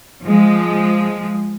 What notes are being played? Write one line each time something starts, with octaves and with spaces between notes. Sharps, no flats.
F3 G#3